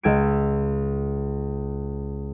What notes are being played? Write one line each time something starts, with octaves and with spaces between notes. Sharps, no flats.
C#2 E6 G#6 D7